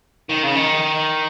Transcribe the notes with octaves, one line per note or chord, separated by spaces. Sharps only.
D#3
C#3
D#3